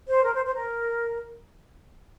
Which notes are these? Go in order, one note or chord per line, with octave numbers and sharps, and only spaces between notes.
C5
A#4
C5
C5
A#4